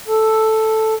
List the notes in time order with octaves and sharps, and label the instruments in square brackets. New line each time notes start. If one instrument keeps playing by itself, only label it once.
[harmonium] A4